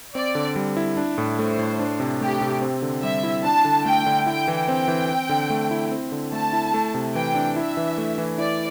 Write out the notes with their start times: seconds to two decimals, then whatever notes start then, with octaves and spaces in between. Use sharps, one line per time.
0.15 C4 D5
0.35 D3
0.56 G3
0.77 E4
0.97 D4
1.18 A2
1.39 A3 C5
1.59 A2
1.79 D4
2.00 C3
2.21 A3 G4
2.41 C3
2.62 C4
2.82 D3
3.02 G3 E5
3.23 E4
3.44 D4 A5
3.65 D3
3.85 A3 G5
4.06 D3
4.26 E4 G5
4.48 E3
4.68 C4 G5
4.88 E3
5.09 C4
5.29 D3
5.50 A3
5.71 E4
5.91 C4
6.12 D3
6.32 A3 A5
6.53 E4
6.74 A3
6.94 C3
7.15 E3 G5
7.35 D4
7.56 E4 E5
7.77 E3
7.98 A3
8.18 E3
8.38 E4 D5